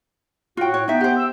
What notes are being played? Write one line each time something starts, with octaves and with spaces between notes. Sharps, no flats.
A2 F4 F#4 G5
C#5
B3 D#4 E5 G5
G4 C5
E6